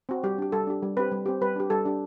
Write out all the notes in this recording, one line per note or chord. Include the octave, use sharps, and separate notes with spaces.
C4 F#4
G3 G4
D4 G4
G3 A4
D4 G4
G3
C4 G4 B4
G3
C4 G4
G3 B4
D4 G4
G3 A4
D4 G4